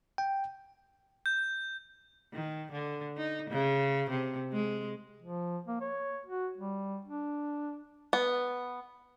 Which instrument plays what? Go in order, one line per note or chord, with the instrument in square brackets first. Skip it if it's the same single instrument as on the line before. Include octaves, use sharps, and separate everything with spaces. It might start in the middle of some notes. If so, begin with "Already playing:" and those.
[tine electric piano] G5
[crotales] G6
[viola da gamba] D#3
D3
D#4
C#3
C3
G#3
[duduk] F3
A#3
C#5
F#4
G3
D4
[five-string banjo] B3